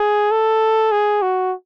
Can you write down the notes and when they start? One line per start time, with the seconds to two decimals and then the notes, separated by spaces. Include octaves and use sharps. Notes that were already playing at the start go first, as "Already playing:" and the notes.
Already playing: G#4
0.32 A4
0.92 G#4
1.22 F#4